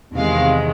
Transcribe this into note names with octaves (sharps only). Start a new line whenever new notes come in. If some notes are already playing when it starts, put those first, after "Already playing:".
E2 C3 D#3 G#3 F5